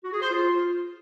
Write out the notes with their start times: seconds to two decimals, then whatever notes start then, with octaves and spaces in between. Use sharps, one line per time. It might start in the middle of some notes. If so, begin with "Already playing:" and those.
0.04 F#4
0.13 G#4
0.22 C5
0.30 F4